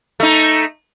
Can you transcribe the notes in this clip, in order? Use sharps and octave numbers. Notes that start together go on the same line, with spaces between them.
A3 D#4